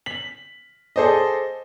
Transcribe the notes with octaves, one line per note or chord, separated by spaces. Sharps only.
B6 F#7
G#4 A4 C5 D5 D#5